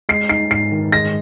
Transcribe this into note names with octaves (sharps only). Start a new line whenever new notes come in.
G#3 C7
D#4 C7
G#2 C7
D#3
G#3 A#6